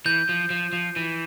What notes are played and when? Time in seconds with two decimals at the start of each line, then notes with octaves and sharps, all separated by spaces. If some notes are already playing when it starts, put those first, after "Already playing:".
0.06 E3 G6
0.29 F3
0.50 F3
0.73 F3
0.96 E3